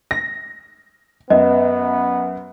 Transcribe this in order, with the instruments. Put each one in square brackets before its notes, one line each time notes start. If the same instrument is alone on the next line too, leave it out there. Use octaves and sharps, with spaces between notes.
[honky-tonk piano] A#6
[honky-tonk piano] F#2 [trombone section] B3 [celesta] D#5